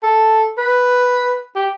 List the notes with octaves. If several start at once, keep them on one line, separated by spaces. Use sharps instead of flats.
A4
B4
G4